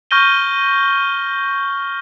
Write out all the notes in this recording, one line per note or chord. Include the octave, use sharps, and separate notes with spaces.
C#6 F6 G6 A#6 D#7 G7